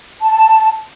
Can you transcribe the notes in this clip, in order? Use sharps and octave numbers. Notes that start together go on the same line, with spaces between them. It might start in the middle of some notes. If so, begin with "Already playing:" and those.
A5